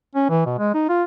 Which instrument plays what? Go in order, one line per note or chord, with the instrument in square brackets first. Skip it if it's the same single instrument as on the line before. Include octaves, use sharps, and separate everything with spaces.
[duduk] C#4
E3
B2
G#3
D#4
F4